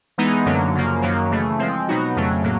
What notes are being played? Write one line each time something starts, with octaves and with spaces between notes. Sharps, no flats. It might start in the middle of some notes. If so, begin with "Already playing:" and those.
E3 G#3 B3 D#4
F#2 D3 F#3 A#3
F#2 C#3 F3 A#3
F#2 D#3 F#3 A#3
C#3 E3 A3
F3 G#3 C4
B2 F#3 B3 D#4 F#4
F2 C#3 F#3 A3
A2 F#3 A#3